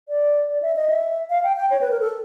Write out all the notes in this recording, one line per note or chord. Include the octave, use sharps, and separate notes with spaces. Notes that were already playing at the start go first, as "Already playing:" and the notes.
D5
D5
E5
D#5
E5
F5
G5
G5
C#5
B4
A#4
A4